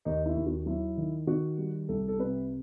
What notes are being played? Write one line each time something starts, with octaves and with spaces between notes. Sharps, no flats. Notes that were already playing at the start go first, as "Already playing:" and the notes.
D#2 D#4
E4
D#2
F#4
F#3 E4
D#3
D#3 F#4
G3
C2 A4
A4
C3 B4